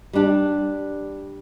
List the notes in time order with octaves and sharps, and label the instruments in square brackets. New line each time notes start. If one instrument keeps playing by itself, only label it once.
[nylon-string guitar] G3 D4 G4